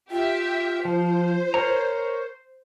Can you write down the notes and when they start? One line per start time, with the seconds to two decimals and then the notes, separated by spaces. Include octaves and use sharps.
0.11 F4 G4 E5
0.85 F3 C5
1.54 A#4 C#5 A#5